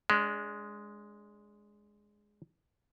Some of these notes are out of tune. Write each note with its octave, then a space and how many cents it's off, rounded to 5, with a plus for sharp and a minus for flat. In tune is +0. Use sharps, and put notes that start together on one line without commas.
G#3 +0 D4 -30